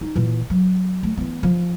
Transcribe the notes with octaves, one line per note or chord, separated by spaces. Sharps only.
D#4
A#2 E3
F#3
A3
E3 B3
F3